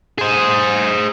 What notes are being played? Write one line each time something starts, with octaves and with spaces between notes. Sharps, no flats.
G#4 C5